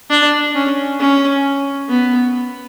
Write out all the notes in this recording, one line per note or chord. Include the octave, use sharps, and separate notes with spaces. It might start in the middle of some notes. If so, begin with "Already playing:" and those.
D4
C#4
C#4
B3